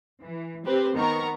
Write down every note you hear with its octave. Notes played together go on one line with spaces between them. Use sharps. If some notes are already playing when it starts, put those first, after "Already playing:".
E3
C4 G4 B4 C5
D#3 B3 A#4 A#5 C#6